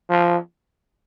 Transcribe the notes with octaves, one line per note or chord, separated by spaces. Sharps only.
F3